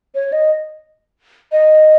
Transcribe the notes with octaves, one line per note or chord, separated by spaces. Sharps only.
C#5
D#5
D#5